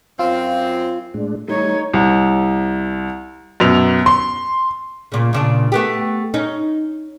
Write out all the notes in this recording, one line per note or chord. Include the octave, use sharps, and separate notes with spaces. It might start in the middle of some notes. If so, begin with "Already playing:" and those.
F#2 C4 F4
A2 G#3 D4
G3 A3 D#4 C#5
C2
F#2 B2 F7
C6
A#2 C#3
A#2 C#3 D4
A3 B3 G4
C#4 D#4